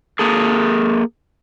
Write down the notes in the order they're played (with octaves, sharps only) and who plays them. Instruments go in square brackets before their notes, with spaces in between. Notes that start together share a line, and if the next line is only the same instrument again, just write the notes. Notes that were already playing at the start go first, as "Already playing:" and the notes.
[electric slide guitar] A#3 G#4 A4